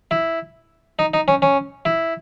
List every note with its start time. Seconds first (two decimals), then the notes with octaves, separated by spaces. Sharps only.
0.11 E4
0.99 D#4
1.14 D#4
1.28 C#4
1.42 C#4
1.85 E4